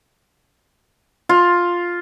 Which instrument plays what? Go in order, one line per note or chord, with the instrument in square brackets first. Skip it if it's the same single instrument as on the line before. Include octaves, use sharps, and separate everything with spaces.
[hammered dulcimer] F4